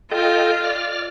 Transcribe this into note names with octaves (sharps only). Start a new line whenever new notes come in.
F4 A4 D#5 G5
D5 F6